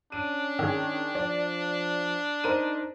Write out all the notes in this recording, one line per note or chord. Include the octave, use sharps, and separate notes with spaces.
C#4 D4 D#7
D#3 G#4
F3 D5
D#4 A#4 C5 D#7